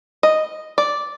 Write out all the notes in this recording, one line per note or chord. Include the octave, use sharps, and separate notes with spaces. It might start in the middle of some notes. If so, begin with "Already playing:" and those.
D#5
D5